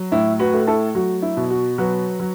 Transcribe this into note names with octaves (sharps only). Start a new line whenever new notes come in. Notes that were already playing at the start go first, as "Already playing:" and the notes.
Already playing: F#3
A2 E4
F#4 B4
A3
E4 A4
F#3 F#4
E4
B2
F#4
F#3 F#4 B4
F#3